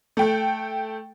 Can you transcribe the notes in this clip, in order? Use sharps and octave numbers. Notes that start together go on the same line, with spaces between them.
A3 G5